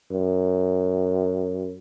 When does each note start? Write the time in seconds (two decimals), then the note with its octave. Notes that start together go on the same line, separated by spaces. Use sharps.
0.11 F#2